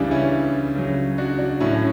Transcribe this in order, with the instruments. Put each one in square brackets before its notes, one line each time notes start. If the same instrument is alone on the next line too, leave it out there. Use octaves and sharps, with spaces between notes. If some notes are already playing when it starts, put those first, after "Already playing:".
Already playing: [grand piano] C#2 C#3 E3 G3 D4
C#4 E4
C#2 C#3 F#3
D4 F#4
D4 F#4
A2 F#3 C#4 E4
C#4